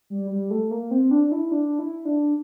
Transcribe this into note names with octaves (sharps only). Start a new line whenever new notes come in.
G3
G3
A3
A#3
C4
D4
E4
D4
E4
D4